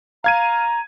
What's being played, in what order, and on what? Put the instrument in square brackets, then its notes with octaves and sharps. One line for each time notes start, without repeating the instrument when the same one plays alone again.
[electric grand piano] F5 G#6 D#7 [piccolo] A#5